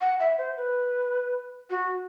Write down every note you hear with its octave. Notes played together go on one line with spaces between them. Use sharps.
F#5
E5
C5
B4
F#4